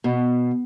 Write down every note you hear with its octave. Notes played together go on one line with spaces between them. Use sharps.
B2